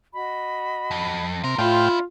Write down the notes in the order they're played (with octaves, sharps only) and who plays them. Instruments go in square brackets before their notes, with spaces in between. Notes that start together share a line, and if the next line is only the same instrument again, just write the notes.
[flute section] F#4 D#5 B5
[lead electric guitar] F2
[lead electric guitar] C2 A#4 [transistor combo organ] C3 A#5 [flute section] C6
[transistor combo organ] A2 F5 G5 [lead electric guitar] D4 E4 [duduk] F4